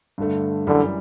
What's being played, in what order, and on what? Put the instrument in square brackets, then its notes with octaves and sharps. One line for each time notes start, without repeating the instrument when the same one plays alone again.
[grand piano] G2 D3 A3
[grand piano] F#2 E3 G3 [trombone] D3